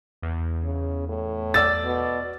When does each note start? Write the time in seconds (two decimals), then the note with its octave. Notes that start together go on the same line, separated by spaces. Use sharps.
0.22 E2
0.64 C#3
1.09 A2
1.54 D5 E6 A6
1.84 B2